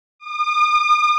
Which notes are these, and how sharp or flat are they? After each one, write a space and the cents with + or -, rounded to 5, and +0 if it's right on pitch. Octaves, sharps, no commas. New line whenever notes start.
D#6 -45